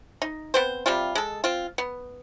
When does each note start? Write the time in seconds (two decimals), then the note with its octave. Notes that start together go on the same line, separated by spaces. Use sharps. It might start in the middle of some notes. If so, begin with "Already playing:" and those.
0.22 D#4
0.54 B3 C4 C5
0.86 C3 G3 C4 F4
1.15 G#3 A4
1.44 C4 F4
1.78 B3